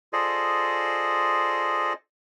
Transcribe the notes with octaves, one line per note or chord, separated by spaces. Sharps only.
F4 G#4 A4 C5 D5 D#5